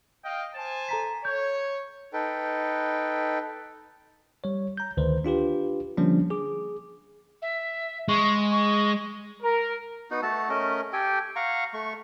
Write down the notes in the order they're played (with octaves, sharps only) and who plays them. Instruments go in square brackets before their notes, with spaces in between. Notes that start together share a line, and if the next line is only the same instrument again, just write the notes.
[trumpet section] D#5 F5 G5
C5 G#5 A5
[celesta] A4 A#5 B6
[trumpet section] C#5 [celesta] G6
[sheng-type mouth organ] D#4 A4 B4 G5
[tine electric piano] G3 C#5
A#5 G6
D2 D#3 B4 C5
D4 F4 G4 B4
D3 F3 G3 A#3 C#4 D4
G#4 D6
[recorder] E5
[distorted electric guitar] G#3 [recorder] C#6
[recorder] C#6
[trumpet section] A#4
[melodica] B3 D#4 F#4
A3 F#4 A4 A5
A3 C#4 A#4 D#5
G4 A4 G5 G#5
F5 F#5 A#5 C#6
A3 C#6